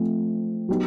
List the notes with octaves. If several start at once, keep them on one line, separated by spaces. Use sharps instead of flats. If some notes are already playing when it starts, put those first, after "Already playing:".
Already playing: F3 A3 C4
F#3 B3 D#4 G4